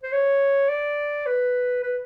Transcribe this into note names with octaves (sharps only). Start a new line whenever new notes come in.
C5
C#5
D5
B4
B4